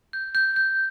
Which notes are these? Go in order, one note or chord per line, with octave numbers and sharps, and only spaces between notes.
G6
G6
G6